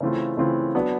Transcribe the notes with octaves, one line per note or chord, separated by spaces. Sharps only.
C#3 E3 A3 C4 F4
C#3 E3 A3 C4 F4
F#3 B3 D4